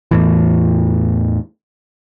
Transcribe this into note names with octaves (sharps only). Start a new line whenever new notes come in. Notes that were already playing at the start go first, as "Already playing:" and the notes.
E2 A2 E3